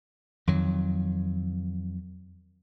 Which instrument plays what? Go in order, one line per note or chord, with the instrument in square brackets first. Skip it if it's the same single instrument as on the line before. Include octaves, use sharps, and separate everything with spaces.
[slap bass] F2 D#3 F#3